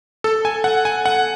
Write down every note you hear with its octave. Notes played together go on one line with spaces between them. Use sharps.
A4
G#5
F#5
G#5
F#5